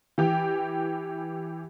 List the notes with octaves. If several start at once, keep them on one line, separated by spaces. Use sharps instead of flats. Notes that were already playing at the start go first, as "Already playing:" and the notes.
E3 G4 G5